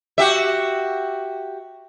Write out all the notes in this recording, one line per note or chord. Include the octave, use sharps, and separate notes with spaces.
F#4 G4 E5